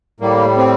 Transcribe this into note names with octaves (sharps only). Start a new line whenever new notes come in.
A2 G3 A#3
C4